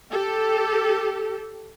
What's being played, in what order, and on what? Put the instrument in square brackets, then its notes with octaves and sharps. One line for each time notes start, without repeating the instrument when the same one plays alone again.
[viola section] G4 A4